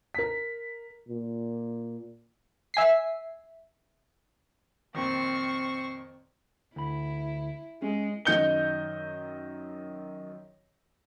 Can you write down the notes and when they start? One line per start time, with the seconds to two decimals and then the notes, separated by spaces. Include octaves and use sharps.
0.15 A#4 B6
1.08 A#2
2.74 E5 G#5 B6 C7
4.95 F2 A#2 D#3 C4 C#6
6.76 D2 E4 B5
7.82 G#3 C#4
8.25 F#2 D#3 D#5 G6 C#7 G7